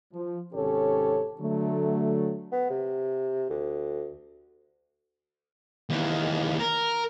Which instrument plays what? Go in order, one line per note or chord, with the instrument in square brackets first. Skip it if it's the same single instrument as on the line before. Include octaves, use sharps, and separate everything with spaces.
[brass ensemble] F3
G#1 C3 C#4 G4 A4 C#5
D3 F#3 A3
[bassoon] B3
C3
D2
[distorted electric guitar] D#2 E3
A#4